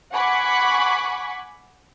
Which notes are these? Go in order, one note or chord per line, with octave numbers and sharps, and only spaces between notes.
F#5 G#5 B5 C#6 D6